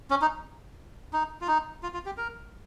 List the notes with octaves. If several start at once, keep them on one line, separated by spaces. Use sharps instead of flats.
C#4
D#4
D#4
F4
D#4
F4
F4
G4
A#4